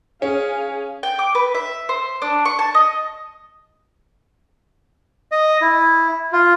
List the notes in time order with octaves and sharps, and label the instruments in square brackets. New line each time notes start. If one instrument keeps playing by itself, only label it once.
[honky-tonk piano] C#4 [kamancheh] G#4 F5
[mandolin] G5
D6
B4
E5
C5
D4
C#6
A5
D#5
[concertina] D#5
E4
F4